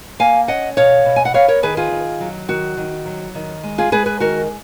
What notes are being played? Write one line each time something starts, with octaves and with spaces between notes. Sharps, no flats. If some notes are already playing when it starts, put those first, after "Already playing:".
A#3 F5 G#5
C#4 D#5 F#5
B2 C#5 F5
B2
G#5
F#5
B3 C#5 F5
A#4 C#5
D#3 G#4 B4
F4 G#4
D#3
F#3
D#3 F#4
D#3
F#3
D#3
G#3
F4 G#4
G#3 G#4 B4
G#4 B4
D#3 F#4 A#4